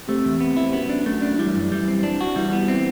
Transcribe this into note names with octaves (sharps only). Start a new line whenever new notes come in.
C3 A3
E2
B3
E4
F#2 B3
D4
F#2 A3
D4
E3 G3
F#2
G3
C4
D4
F#4
E3 G3
B3
E3 C4